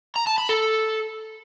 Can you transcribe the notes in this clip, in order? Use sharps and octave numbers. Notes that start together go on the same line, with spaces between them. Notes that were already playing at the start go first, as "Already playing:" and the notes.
A#5
A5
B5
A4